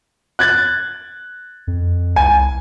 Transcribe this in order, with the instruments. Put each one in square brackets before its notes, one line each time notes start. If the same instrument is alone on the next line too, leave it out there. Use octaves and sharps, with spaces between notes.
[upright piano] F#6 G#6 A6
[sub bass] F2
[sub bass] C2 [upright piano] G#5